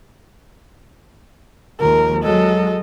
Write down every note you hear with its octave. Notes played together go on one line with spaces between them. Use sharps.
D#2 F3 G#3 A#4
F#3 G#3 A4 D#5